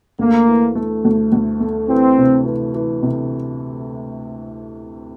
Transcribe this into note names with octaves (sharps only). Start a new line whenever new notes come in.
D2 A#3
E3
A3
D2
D2
A3
E3 C4
C3
E3
E3
C3